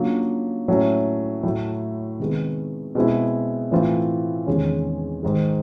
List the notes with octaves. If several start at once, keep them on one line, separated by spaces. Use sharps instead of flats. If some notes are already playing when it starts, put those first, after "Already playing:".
Already playing: C#3 F#3 A#3 D4 F4
A2 F#3 A3 C#4
A2 F#3 A3
C3 D#3 G#3 B3
B2 G#3 C4 E4
A2 E3 A3 C4 F4
E2 C3 D#3 G#3 C#4
G#2 D#3 G#3